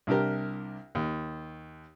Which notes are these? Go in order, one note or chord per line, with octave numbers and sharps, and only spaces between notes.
C2 D4 G4 A#4
D#2